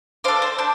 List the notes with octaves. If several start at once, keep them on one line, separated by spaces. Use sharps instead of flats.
D4 A4 C5 F5
C5
D4 C5